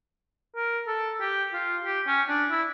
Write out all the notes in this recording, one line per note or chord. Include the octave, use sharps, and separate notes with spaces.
A#4
A4
G4
F4
G4
C#4
D4
E4